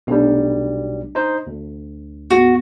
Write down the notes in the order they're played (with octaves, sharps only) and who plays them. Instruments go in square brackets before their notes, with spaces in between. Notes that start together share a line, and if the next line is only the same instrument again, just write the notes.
[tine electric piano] B1 G3 [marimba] C3 A3 D4
[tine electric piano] D#4 C5
D2
[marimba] G#2 F#3 B3 [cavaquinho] F#4